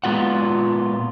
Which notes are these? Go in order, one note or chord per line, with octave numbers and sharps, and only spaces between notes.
A#2 G#3 B3 F4 F#5